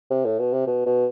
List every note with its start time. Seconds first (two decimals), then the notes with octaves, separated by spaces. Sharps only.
0.10 C3
0.25 A2
0.39 B2
0.53 C3
0.67 B2
0.86 B2